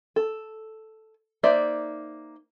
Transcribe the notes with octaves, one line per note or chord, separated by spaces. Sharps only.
A4
A#3 D#4 C5 D5 E5